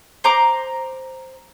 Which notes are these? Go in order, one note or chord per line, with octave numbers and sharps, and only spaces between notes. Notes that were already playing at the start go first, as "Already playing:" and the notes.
C5 A#5 D6